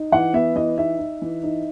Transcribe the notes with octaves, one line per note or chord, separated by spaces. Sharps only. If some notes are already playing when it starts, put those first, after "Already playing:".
Already playing: D#4
E3 F#5
B3 E5
E3 D#5
D#4 E5
D#4
E3
D#4